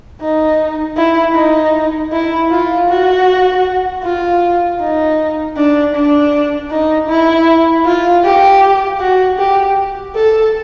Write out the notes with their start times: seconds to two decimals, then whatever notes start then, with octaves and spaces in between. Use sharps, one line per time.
0.21 D#4
0.97 E4
1.35 D#4
2.12 E4
2.51 F4
2.89 F#4
4.03 F4
4.80 D#4
5.56 D4
5.95 D4
6.70 D#4
7.09 E4
7.85 F4
8.24 G4
9.00 F#4
9.38 G4
10.15 A4